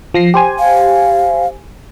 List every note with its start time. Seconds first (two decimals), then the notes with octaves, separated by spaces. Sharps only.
0.14 F3 A#6 C7
0.34 G4 C5 G#5
0.59 F5